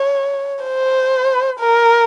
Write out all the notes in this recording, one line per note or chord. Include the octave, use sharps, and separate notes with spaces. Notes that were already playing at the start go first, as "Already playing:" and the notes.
Already playing: C#5
C5
A#4